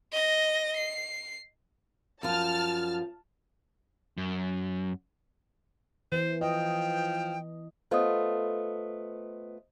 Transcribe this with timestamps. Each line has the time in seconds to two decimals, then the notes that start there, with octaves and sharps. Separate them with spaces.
0.12 D#5 A#6
0.77 C7
2.23 F#2 F3 A5 F6 A6
4.17 F#2
6.12 E3 C5
6.41 F3 D#5 G5
7.91 A3 B3 F4 C5 D#5 D#6